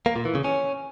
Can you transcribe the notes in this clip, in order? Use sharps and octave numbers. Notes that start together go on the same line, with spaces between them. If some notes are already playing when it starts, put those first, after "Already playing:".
A#3
A#2
E3
C#3
C#4